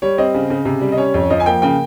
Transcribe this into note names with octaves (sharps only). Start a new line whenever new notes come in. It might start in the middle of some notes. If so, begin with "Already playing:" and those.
G3 C#5
C4 D#5
C#3
C#3
C3
G3
D#5
C#4 C#5
F2
C#5
F3 D#5
G#5
A#3 G5
C#3 G5